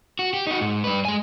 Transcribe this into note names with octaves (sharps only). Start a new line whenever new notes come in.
F#4
G4
D#4 F#4
G#2
G2 B4
G#3 G#5